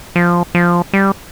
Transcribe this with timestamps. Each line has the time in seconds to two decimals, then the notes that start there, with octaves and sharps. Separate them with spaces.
0.16 F3
0.55 F3
0.93 G3